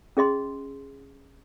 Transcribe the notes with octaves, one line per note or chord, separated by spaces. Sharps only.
C#4 G#4 D#5 C6